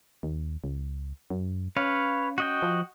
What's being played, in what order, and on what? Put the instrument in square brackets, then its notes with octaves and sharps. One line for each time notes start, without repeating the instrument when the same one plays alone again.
[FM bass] D#2
C#2
F#2
[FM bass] C#4 [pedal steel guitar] B4 C#5 F5
[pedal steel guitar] F#4 D#5 G5
[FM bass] F3